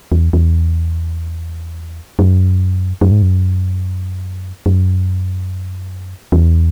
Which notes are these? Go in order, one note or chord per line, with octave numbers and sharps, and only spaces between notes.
E2
E2
F#2
F#2
G#2
F#2
F#2
E2